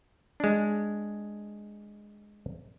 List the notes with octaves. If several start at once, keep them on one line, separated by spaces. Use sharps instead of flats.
G#3 D4